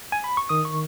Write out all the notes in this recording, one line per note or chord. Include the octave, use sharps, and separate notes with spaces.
G#5
B5
C#6
D#3 D#6
C#6